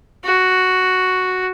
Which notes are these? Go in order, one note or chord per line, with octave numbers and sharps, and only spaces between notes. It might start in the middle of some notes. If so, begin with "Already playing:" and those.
F#4